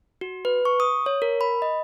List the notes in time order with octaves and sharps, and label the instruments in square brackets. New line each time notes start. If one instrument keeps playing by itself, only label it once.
[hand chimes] F#4
B4
C#6
D#6
C#5
A#4
B5
D#5